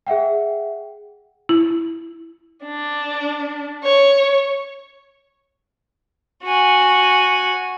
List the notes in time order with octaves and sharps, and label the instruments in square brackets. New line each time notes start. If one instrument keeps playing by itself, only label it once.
[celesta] G#4 E5 F#5 G5
[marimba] E4
[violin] D4
C#5
[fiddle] F#4 G#5